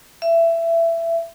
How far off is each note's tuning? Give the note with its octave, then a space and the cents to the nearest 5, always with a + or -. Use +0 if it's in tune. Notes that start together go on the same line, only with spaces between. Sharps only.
E5 +20